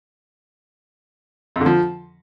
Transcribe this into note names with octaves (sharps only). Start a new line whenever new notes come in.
F2
D3
F3